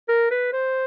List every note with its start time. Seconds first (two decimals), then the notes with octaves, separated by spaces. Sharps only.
0.09 A#4
0.31 B4
0.53 C5